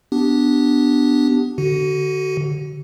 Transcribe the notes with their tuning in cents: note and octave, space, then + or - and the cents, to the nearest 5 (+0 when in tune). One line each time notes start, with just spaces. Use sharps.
B3 +15 D4 +0 G4 -5
D3 +0 F#4 +30